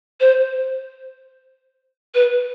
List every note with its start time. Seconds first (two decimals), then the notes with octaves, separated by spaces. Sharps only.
0.21 C5
2.15 B4